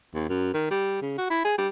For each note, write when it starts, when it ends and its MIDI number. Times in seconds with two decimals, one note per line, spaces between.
0.14 0.25 39
0.29 0.53 42
0.54 0.69 51
0.71 0.98 55
1.02 1.14 49
1.18 1.28 66
1.30 1.42 64
1.45 1.58 68
1.58 1.68 55